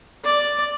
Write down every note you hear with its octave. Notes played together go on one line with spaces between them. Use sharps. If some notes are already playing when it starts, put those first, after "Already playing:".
D5